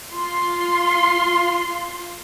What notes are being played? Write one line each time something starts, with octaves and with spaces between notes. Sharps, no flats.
F4 C6